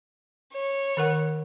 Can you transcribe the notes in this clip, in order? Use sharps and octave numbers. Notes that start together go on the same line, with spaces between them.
C#5
D#3 A#4 F#5